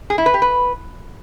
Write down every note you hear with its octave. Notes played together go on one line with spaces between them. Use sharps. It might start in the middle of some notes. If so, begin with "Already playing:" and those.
G#4
E4
B4
G4
B4